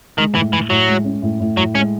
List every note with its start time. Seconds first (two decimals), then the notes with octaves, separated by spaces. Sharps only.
0.18 D#3 G#3
0.35 A2 E3
0.53 A2 E3
0.70 A2 F#3
0.88 G#3
1.05 C#4
1.22 A2
1.40 A2
1.57 A2 F#3
1.75 G#3 C#4